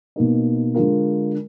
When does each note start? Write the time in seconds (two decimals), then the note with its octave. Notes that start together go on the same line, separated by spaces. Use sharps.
0.16 B2 A#3 D#4
0.75 D3 G#3 D4 F4 A#4